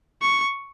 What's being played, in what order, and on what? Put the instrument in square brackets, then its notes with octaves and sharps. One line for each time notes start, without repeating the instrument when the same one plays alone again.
[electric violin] C#6